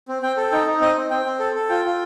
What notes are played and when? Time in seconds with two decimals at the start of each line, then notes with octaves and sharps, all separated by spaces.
0.08 C4
0.22 C4 G5
0.37 A4
0.51 D#4 G5
0.67 D#4
0.81 C4 D#5
0.97 C4
1.10 C4 G5
1.25 C4
1.40 A4
1.55 A4
1.69 F4 G5
1.85 F4